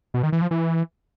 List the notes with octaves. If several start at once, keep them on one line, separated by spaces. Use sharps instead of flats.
B2
D#3
E3
F3
E3